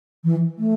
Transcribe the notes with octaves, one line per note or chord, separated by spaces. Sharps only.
E3
A3